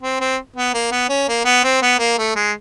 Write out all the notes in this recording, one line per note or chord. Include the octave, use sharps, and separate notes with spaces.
C4
C4
B3
A#3
B3
C#4
A#3
B3
C4
B3
A#3
A3
G#3